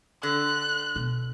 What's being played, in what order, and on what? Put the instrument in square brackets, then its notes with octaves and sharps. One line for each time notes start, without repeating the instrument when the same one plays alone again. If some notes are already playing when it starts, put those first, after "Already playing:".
[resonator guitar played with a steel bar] D3 [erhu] F#6
[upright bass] B2